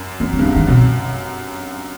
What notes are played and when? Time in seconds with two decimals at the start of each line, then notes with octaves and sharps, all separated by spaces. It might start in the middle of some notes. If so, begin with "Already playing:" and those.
Already playing: F#2
0.20 F#2 A#3
0.33 C4
0.39 G2 F3
0.44 G#2 F#3
0.56 D#3
0.68 F#2 B2